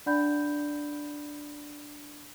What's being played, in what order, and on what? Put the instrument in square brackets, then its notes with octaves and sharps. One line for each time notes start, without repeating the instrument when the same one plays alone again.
[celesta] D4 D5 F#5 B5 G6